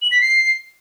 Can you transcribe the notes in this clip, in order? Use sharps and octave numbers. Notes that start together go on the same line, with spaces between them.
F#7
B6
C7